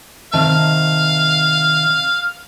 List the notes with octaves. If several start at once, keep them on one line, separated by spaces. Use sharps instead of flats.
C3 D#3 F5 A5